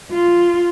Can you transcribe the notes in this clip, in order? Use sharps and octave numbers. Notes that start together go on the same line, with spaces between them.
F4